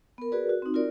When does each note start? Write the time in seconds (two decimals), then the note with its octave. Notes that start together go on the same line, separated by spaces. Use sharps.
0.18 B3 A#4
0.32 F#4 G#4 A#4 B4 D5
0.49 F#4
0.62 C4 D#4
0.74 F4 F#4 A#4 D5